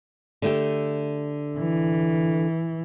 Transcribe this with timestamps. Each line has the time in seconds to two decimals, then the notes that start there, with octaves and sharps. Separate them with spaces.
0.42 D3 A3 G4
1.58 E3